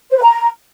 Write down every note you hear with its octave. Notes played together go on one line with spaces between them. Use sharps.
C5
B4
A#5